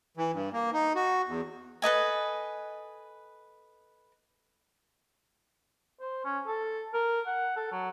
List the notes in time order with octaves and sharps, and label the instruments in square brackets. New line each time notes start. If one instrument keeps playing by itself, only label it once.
[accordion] E3
G2
A#3
D#4
F#4
E2
[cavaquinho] A4 B4 D#5 G#5
[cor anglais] C5
C#4
A4
A#4
F#5
A4
F#3